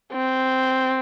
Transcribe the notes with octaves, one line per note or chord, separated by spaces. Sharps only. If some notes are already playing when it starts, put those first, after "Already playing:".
C4